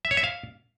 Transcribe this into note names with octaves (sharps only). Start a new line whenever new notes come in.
E5
C#5
E5
F5